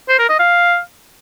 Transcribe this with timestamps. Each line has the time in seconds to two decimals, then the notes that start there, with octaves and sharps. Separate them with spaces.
0.09 C5
0.19 A#4
0.29 D#5
0.39 F5